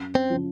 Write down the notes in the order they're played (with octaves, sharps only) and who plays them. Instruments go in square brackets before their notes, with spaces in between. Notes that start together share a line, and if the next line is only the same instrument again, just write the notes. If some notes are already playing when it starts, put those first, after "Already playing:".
Already playing: [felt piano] F#2
[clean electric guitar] C4
[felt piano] C#3 F3